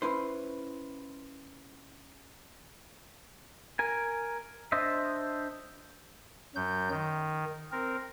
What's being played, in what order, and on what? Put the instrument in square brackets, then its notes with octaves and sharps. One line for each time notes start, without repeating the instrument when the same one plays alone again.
[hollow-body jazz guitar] C#4 E4 B4 C5
[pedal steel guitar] A#4 G#5
D4 C5 D#5 E5
[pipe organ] F#2 F#3 G6
D#3
C4 A#4